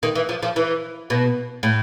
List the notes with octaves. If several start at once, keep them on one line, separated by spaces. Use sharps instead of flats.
D#3
E3
F3
F3
E3
B2
A2